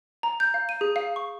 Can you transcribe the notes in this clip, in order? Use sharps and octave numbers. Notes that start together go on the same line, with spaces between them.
A#5
G6
F5
D#7
G#4
F5
C#6